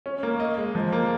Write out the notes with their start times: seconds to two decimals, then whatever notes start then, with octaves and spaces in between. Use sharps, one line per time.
0.06 C#4
0.23 A#3
0.40 D#5
0.58 G#3
0.75 F3
0.93 A#3